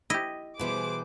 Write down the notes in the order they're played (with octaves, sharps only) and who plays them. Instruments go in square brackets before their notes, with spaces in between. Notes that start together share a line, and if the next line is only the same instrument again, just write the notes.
[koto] E4 G4 [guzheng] D#5
[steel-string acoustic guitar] B2 E3 G3 [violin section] G#4 C5 D6